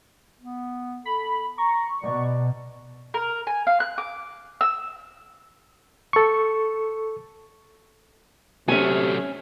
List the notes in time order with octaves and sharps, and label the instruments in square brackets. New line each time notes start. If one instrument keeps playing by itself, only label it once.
[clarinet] B3
[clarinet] A4 [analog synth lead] B5
[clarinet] A#5 [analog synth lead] C#6
[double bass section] B2 [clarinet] D5
[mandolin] A#4
G#5
F5
F#6
D6
E6
[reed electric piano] A4 C#6
[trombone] C3 [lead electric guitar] F#3 A3 [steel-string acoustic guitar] C#4 G#5